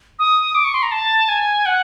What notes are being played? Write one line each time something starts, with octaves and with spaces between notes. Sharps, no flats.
D#6
D6
C#6
C6
A#5
A5
G#5
F#5